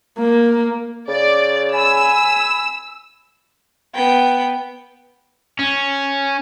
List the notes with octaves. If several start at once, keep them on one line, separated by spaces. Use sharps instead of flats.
A#3
C#3 D5
G#5 B5 E6
B3 G5
C#4